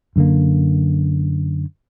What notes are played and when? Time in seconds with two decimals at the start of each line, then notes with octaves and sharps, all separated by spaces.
0.16 F#2 D3 A#3